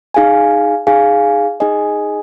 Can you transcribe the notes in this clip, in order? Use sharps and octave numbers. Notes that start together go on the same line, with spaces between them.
D#4 G#4 F5 G#5
D#4 G#4 F5 G#5
D#4 G#4 D#5 G#5